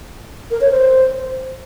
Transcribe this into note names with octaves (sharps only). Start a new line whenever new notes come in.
A#4
C#5
C5